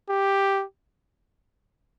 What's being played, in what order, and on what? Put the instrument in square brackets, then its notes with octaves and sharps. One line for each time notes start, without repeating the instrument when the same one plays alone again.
[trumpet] G4